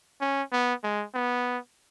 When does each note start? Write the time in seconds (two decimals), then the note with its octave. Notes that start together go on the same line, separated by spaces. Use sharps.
0.21 C#4
0.52 B3
0.84 G#3
1.14 B3